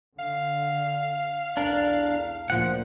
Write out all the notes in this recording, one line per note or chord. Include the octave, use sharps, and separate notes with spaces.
D3 F5
B1 E2 D4 A#4
D2 A#2 F3 F#5